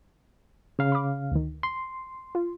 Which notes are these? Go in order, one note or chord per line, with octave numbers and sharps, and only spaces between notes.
C#3 F5
B5 D6
D2 D#3
C6
F4